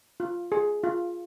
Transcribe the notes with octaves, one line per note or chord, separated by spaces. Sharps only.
F4
G#4
F4